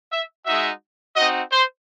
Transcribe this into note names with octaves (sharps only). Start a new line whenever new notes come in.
E5
G#3 D#4 F#4 E5
C4 D#4 F#4 D#5
C5